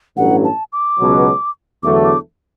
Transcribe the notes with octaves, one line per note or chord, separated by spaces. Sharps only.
A1 G2 F#3 F#5
A5
D6
C#2 B2 F#3
E2 D3 F#3 A3 D6
D6